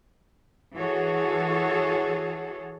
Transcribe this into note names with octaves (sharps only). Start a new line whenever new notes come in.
E3 F#4 G#4 A4 C#5